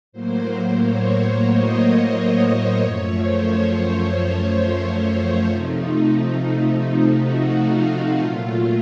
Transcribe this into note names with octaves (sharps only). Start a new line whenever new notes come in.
A2 F#3 A#3 C5
C#5
D#5
F#2 F3 A3 C#5
C5
C#5
C#5
C3 F3 A3 D#4
D#4
F#4
F4
F4
A#2 F#3 A3